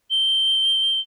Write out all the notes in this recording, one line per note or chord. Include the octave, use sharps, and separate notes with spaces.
G7